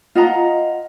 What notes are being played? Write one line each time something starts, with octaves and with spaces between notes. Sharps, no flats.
F4 D#5 F#5 A#5